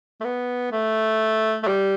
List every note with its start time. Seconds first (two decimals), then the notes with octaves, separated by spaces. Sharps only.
0.21 A3
0.24 B3
0.72 A3
1.63 A3
1.67 G3